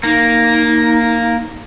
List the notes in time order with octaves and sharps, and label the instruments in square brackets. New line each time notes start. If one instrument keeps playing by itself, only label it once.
[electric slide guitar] A#3 [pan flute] D#4